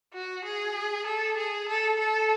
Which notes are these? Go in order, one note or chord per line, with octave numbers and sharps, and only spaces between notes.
F#4
G#4
A4
G#4
A4
A4